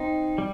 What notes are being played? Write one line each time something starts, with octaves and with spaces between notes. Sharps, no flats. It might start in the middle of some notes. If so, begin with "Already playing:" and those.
Already playing: C4 D#4
G3